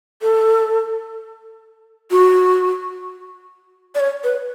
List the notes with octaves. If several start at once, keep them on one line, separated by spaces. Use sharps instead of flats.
A4
F#4
D5
C#5
B4